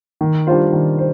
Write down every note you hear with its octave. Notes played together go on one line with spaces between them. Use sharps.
D#3
G3 D4 F4 C5
D#3
C5